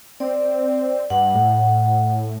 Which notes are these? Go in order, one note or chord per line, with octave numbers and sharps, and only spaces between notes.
C4 D5
G2 F#5
A2